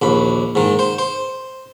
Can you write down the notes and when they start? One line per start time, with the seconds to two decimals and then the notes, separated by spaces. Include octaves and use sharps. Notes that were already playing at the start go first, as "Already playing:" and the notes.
0.02 A#1 D#2 B5
0.55 G#2 D#3
0.79 C5
0.99 C5